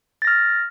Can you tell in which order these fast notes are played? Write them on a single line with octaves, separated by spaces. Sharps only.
A6 A#6 F6